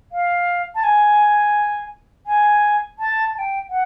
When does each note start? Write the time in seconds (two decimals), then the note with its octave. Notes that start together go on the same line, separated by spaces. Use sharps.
0.12 F5
0.75 A5
0.83 G#5
2.26 G#5
2.99 A5
3.34 A5
3.38 G5
3.69 F#5